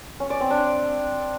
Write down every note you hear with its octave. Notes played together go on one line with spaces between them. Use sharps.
C#4
D5
C4
D4